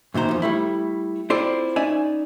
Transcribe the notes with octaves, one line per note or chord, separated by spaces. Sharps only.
F#2 A#2 D#3 C5 A#5
E2 F3
G3 A3 E4
C4 E4 F4 A4 C5 D5
C#4 D#4 D5 E5 G#5